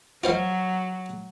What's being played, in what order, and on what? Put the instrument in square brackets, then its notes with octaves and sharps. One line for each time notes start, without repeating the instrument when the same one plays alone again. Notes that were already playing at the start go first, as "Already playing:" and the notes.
[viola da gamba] F#3 [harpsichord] F4 C5 F5